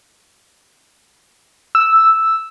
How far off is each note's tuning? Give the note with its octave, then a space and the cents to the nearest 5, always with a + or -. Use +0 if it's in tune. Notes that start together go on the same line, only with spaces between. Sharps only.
E6 +0